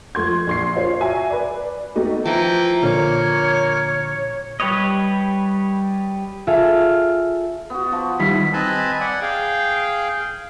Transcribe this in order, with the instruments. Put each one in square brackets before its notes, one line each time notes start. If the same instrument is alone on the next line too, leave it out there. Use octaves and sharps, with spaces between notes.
[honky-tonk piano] F3 A3 C6 G#6
A#1 C6 C7
F4 C5 C#5
F#4 E5 G#5
B4 D5
A3 B3 D#4 F#4 G4
[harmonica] E3 G5 A#5 [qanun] F3
[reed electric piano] A#2 D3 [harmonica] A#3 [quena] C#5
[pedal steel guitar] G3 G4 B4 C#5 D#5
[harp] F4 G#4 A4 E5 F5
[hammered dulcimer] B3 F#4
F3
[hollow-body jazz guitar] D#3 G3 [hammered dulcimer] E4 [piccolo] B6
[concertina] C4 B4 D#5 G#5 A5 B5
D5 F#5 G#5
G#4 F5 G5